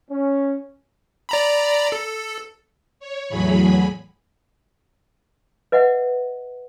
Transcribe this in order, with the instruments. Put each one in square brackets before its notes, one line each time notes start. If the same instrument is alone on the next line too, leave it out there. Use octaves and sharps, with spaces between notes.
[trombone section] C#4
[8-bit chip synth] D5 A#5 B5
A4
[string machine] C#5
E2 A2 F#3 G#4 B5
[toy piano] B4 D#5 E5 F#5